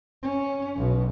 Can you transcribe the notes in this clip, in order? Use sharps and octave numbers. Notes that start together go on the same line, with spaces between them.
C#4
B1 B2